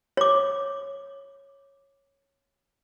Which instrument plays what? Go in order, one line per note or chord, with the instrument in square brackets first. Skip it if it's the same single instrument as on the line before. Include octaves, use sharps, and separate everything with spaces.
[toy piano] C#5 D6